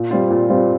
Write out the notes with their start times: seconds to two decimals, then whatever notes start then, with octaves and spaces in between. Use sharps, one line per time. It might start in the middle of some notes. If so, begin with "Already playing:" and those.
Already playing: A#2
0.11 G3 C4 F4
0.30 A#2
0.50 G3 C4 F4